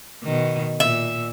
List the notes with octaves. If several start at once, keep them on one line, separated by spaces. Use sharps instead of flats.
B2 D#3
A#2 E5